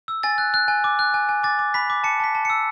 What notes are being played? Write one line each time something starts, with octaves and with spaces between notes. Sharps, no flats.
E6
G#5 A6
F#6
F#6
G#5
D6
F#6
G#5
G#5
D6 A6
D6
B5 B6
D6
A5 C#7
A5 B6
A5
E6 C#7